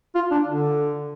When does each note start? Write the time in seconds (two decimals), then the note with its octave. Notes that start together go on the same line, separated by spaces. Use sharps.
0.15 F4
0.31 D4
0.47 D3